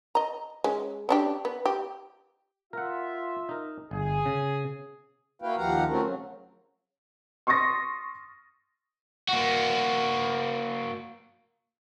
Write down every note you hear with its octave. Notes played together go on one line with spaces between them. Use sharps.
D#5 A#5
G#3 C#4
C#4 D4 G4
B3
G4
F4 A#4 E5 F#5
D#4 A#4
G1 G#4
C#3
A#3 E4 F#4 B4 F5 G5
D#2 F3 G4 F5 F#5 A#5
A3 C4 C#4 F4 F#4 A#4
C#3 F#3
C6 C#6 D#6 A6 A#6
A#3 F#4